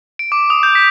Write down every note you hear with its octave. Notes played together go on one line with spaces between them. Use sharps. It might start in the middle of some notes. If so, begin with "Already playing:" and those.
D7
D6
D#6
G6
B6